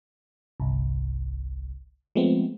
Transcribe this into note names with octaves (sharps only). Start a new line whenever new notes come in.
G1 C2
F3 G#3 A3 B3 C4